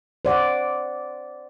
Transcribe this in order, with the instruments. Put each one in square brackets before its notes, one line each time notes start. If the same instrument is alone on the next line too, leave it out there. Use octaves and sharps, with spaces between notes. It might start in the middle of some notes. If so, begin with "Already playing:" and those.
[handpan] C5 D5 F#5